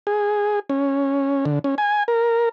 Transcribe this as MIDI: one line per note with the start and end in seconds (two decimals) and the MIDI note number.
0.07 0.60 68
0.70 1.45 61
1.45 1.59 50
1.64 1.75 61
1.78 2.03 80
2.08 2.49 70